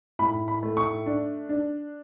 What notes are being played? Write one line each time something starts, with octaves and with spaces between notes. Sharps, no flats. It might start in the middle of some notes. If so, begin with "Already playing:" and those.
A2 B5
B5
A3
C#6
D4
D4